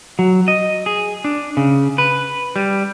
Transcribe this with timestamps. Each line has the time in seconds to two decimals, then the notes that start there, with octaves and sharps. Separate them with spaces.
0.19 F#3
0.48 D#5
0.86 G#4
1.24 D4
1.57 C#3
1.98 B4
2.56 G3